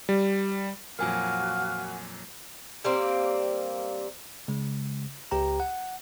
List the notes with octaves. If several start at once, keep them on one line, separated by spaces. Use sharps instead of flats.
G3
F2 A#2 F#3 F#4 A#4 F5 G#5 D7
G3 A#3 C4
C#3 G#3
C#2 G4 G5 A#5
F#5